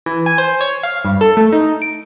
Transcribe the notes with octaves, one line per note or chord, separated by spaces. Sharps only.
E3
G#5
C5
C#5
F5
G2
A4
A3
D#4
D7